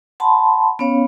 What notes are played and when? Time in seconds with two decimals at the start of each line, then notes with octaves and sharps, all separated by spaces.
0.20 F#5 A5 B5 C6
0.79 B3 C#4 C#5 F5